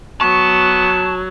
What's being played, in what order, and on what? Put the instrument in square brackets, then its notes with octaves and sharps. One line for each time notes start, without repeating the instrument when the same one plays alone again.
[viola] F#3 [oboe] B3 [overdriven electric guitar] A5 [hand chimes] C#6